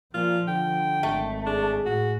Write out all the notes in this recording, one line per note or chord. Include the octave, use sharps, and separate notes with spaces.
A#2 F3 F4
D3 G5
G#1 A3
D4 G#4
A2 F#4